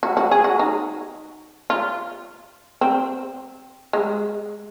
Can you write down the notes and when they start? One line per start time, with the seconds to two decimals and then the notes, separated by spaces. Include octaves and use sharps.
0.03 F#4
0.17 F#4
0.31 G#4
0.44 F#4
0.59 D#4
1.70 F4
2.81 C4
3.93 G#3